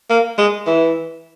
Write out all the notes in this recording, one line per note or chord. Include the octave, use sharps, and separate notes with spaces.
A#3
G#3
E3